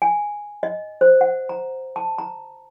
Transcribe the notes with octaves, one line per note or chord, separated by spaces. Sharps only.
G#5
D#5
C5
F#5
A#5
A5
A#5